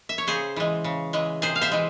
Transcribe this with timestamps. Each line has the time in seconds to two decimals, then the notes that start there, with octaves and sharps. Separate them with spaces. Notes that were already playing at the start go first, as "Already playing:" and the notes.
0.09 E5
0.18 C#5
0.27 C#3 G#4 C5
0.56 E3 G#3
0.84 C#3
1.13 E3 G#3
1.42 C3 G#4 C5
1.56 F5
1.61 C5 E5
1.71 E3 G#3